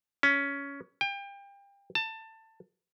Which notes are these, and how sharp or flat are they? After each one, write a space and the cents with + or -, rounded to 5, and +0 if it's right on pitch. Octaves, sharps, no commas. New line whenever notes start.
C#4 +15
G5 +30
A5 +20